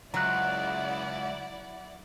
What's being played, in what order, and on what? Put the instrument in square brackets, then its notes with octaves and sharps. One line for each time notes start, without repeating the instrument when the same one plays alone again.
[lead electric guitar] C#2 [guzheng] F#3 [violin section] E4 D5 F#5 [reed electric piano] A#5 F#6